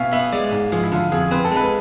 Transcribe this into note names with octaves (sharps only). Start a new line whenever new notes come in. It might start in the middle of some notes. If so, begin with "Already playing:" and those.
Already playing: B2 E5 F5 G#5
B3 E5
G#3 D5
G#2
F3 G#4
E4
D3 F4
F2 G#4
C4 B4
A4
G#3
B4